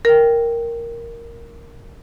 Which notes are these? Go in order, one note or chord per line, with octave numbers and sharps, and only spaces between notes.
A#4 G5